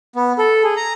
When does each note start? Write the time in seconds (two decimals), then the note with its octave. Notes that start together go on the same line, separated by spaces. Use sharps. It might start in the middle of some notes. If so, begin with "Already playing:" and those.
0.16 B3
0.38 A4
0.64 G#4
0.76 A#5